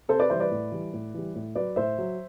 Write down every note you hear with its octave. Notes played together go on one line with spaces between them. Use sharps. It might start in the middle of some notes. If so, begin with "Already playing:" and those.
C3 A4 C5
B4 D5
E3 G3 C5 E5
B4 D5
A2
E3 G3
A2
E3 G3
A2
F#3 B4 D5
A2 C5 E5
F#3